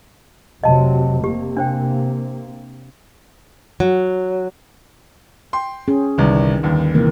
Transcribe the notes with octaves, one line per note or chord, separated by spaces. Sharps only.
F1 C3 F#3 D#5 A5
C3 A#3 G4
D4 C5 G5
F#3
G5 C6
C#4 G#4
G1 C2 D#3
G1 D#2
C3 E3 A#3